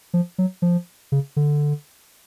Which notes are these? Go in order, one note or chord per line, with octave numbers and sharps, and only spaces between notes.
F3
F#3
F3
C#3
D3